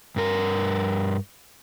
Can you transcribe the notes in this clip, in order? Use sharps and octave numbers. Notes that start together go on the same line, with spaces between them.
G2 A#4